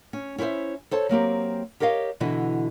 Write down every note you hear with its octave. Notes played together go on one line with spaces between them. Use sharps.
C#4
C#4 E4 B4 C5 E5
A4 C5 C#5 A5
F#3 A#3 C4 G4
G4 A#4 C#5 D#5 F5
B2 D3 E3 E4 F#4